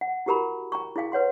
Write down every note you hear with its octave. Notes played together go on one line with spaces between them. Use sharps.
F#5
E4 F#4 G4 A#4 A#5 B5
G5 A#5 C#6
E4 G#4 F5 G5
B4 C#5 F#5 C6